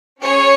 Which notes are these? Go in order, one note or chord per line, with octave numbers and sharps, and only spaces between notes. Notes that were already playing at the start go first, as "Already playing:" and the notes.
C#4 G#4 C#5